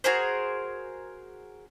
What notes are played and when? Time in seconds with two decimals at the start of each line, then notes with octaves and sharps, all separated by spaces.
0.04 F#4 G#4 A#4 C5